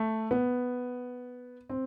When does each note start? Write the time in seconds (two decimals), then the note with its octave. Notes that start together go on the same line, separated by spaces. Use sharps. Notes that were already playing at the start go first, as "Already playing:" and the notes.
Already playing: A3
0.31 B3
1.69 C4